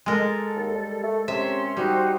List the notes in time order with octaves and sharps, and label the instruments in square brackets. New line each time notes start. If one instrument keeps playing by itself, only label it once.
[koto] G#3 A#4 [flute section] A4
[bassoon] D#2
G3
A3
[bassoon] C3 [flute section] C#4 C6 [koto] E5
[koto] G3 [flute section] D#4 F#4 C5 [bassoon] G4